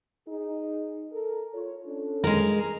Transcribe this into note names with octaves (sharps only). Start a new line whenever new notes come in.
D#4 G#4
A4 A#4
F4 C#5
C#4 D4 A4
G#3 A#4